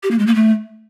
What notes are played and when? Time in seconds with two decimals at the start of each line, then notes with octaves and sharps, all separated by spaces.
0.03 G4
0.11 A#3
0.19 G#3
0.27 A#3
0.35 A3